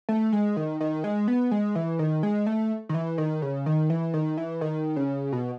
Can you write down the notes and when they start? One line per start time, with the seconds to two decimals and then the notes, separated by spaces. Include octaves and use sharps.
0.09 A3
0.32 G#3
0.57 D#3
0.81 D#3
1.04 G#3
1.28 B3
1.51 G#3
1.75 E3
1.99 D#3
2.23 G#3
2.47 A3
2.89 D#3
2.94 E3
3.18 D#3
3.42 C#3
3.66 D#3
3.90 E3
4.14 D#3
4.37 E3
4.61 D#3
4.96 C#3
5.32 B2